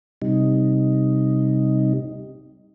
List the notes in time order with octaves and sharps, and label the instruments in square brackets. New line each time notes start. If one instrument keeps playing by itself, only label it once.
[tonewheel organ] C3 G3 D#4